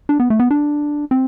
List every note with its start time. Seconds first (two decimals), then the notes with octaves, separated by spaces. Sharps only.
0.09 D4
0.20 B3
0.30 A3
0.40 B3
0.51 D4
1.11 C4